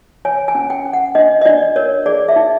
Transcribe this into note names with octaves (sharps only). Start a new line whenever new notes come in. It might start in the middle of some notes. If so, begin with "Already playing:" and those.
C#5 G#5
G#5
C#4
G5
C#4
F#5
D4 D#5
D#5
D4 D5
A#4 C#5
G#4 D5
E5
D#4